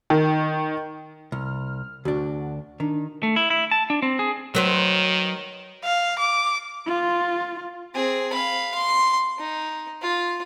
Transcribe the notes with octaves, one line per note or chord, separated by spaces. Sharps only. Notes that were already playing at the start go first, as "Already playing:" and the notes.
D#3
C2 F6
D2 D4 F#4
D#3 D4
A3
E4
E4
A5
D4
C4
G#4
D#3 F#3 B4 C5
F5
D6
F4
C4 G#4
F5 B5
C6
D#4
F4